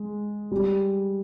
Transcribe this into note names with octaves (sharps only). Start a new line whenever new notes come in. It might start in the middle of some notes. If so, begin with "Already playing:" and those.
Already playing: G#3
G3